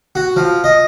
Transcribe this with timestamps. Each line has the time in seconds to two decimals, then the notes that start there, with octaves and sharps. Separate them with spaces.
0.15 F#4
0.36 F3
0.64 D#5